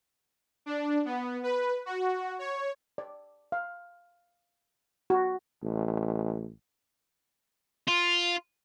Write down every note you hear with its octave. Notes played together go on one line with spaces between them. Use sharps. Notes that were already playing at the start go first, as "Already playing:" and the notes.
D4
B3
B4
F#4
C#5
D5
F5
F#4
A1
F4